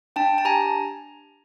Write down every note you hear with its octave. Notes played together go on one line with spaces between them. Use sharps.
D4 G5 A5
A5
G4 G#5 A#5